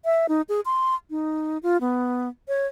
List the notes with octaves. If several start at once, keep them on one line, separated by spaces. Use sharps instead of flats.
E5
D#4
G#4
C6
D#4
F4
B3
C#5